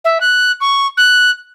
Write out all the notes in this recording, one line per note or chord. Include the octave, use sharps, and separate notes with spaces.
E5
F#6
C#6
F#6